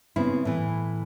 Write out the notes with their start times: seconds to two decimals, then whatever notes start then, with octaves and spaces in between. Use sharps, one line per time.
0.16 C#3 B3 C4 E4
0.45 A2 E3